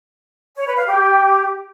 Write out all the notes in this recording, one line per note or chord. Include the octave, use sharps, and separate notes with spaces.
C#5
B4
F5
G4